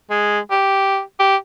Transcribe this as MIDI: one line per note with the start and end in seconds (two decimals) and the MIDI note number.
0.10 0.39 56
0.51 1.00 67
1.19 1.37 67